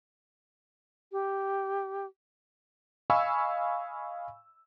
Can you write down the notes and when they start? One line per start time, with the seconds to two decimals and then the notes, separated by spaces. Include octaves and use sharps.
1.12 G4
3.10 D#5 F5 G#5 B5 C#6 E6